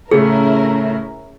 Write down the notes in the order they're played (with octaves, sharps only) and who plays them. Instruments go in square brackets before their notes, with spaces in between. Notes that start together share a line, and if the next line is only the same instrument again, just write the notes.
[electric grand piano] A2 C#3 A3 [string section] C#4 E4 A#4 [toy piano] G#4